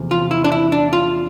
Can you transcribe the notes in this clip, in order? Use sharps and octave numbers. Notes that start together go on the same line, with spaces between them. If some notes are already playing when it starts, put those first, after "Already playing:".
Already playing: E2 C3 F3 A3
F4
E4
D4
E4
D4
F4